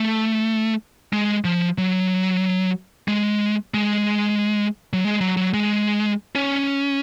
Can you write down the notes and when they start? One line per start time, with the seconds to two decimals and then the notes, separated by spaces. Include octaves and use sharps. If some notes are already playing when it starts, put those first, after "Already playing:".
Already playing: A3
1.13 G#3
1.45 F3
1.78 F#3
3.08 G#3
3.74 G#3
4.93 F#3
5.04 G#3
5.21 F#3
5.37 F#3
5.54 G#3
6.35 C#4